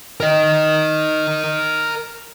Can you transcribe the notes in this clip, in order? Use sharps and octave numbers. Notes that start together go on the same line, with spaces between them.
A#4 D#5